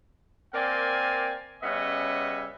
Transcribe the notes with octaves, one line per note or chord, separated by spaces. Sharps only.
A#3 C4 A#4 D5 G5 G#5
C#3 G3 B3 C#4 D#5 E5